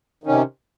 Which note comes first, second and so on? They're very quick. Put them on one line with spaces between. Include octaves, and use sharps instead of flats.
D#3 C#4 C3